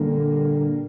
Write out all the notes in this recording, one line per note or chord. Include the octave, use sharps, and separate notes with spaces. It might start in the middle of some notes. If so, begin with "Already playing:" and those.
Already playing: A#2 D3 G3 A#3